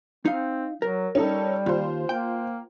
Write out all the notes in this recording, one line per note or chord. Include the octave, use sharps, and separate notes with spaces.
C4 D#4 F5
F#3 A#4
G3 C#4 D#4 A4
D#2 F4 C5
A#3 G5